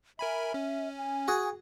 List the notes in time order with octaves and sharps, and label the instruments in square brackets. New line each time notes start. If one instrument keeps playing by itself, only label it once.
[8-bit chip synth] A#4 G#5 B5 [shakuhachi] E5
[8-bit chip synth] C#4
[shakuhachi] G#5
[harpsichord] F#4 G#4